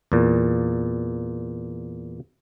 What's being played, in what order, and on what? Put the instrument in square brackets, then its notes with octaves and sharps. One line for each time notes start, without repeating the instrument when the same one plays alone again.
[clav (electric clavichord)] E2 A#2